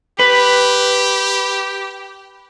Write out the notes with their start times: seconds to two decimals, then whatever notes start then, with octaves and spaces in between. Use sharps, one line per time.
0.20 G4 B4